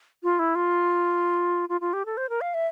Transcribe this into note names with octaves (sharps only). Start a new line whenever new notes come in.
F4
E4
F4
F4
F4
G4
A4
C5
A#4
F5
E5